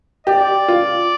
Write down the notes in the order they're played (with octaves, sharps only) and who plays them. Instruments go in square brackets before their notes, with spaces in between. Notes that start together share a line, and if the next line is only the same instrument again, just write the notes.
[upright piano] G4 [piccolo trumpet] D5
[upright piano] F4